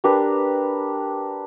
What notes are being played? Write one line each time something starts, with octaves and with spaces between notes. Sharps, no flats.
D4 G4 A#4 B4